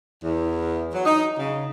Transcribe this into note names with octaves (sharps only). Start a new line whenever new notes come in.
E2
F#3
D#4
C#3